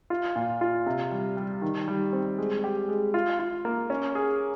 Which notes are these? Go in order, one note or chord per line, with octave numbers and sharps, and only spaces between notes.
F4
A#2
F4
C3
G3
G3
D#3
G3
C4
G#3
G4
G#3
F4
F4
A#3
C#4
G#4